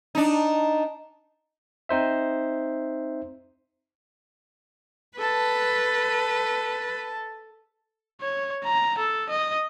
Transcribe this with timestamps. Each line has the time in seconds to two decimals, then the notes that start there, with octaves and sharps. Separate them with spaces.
0.15 D4 D#4
1.89 C4 D#4 C5 E5
5.18 A4 B4 A5
8.21 C#5
8.65 A#5
8.98 A4
9.29 D#5